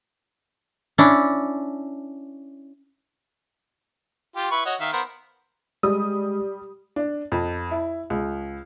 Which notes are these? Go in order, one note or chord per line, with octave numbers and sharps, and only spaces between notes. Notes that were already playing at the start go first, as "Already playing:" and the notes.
C#4 D4 E4
F4 G4
E4 B4 C#6
F#4 C#5 D#5
D#3 E5 F5
B3 A#4 C5
G3 G#3 D#6
D4
F2
E4
C#2